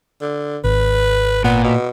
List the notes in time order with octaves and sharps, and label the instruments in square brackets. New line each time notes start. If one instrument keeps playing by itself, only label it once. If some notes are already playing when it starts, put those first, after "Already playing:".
[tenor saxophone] D3
[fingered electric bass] G#1 [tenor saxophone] B4
[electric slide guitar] A#2 [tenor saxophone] B3
[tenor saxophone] B2